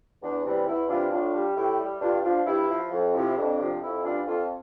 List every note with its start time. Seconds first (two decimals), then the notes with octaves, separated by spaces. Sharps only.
0.22 E2 D4
0.45 C3 E3 G3 D4
0.67 E2 E4
0.89 C3 E3 G3 D4 F4
1.11 A2 D4 F4
1.34 G3
1.56 A2 E4 G4
1.79 G3
2.01 G2 D4 F4
2.24 F3 D4 F4
2.46 G2 E4
2.69 F3
2.91 F2
3.14 C3 F3 E4
3.29 E4
3.37 F2 D4
3.59 C3 F3
3.82 F2 E4
4.04 E3 G3 D4 F4
4.27 F2 F4 A4